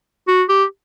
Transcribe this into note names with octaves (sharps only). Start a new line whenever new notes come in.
F#4
G4